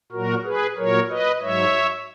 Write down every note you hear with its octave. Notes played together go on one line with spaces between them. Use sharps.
A#2 F#3 F#4 A#4
G#4 B4
A#2 F#3 A#4 C#5
B4 D#5
G#2 F#3 C#5 E5